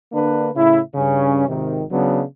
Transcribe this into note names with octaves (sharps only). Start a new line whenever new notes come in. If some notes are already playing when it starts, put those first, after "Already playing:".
D3 A#3 D4 B4
A2 C#3 E4
G2 C#3 C#4
G#1 C3 D#3
C#3 F#3 B3 D4